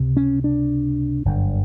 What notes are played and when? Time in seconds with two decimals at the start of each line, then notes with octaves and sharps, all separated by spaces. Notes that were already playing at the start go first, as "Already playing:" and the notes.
Already playing: C#2 C3
0.17 C#4
0.44 D4
1.25 G1 F#2 D3